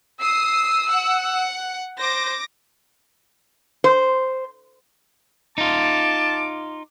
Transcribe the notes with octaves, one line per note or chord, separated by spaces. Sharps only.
D#6 E6 C7
F#5
C5 D6 A#6
C5
D#4 F4 A5 D6